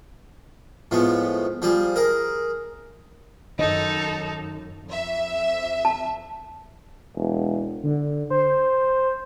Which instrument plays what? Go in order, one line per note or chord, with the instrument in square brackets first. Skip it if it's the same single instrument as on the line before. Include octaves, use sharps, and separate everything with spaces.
[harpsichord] A2 F3 G#3 B3
F3 G3 G#4
G#4 A#4
[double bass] F#2 [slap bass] D#3 [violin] D#4 A4 [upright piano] D#5
[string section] F2 E5
[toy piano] A5
[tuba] E1
[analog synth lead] D3
C5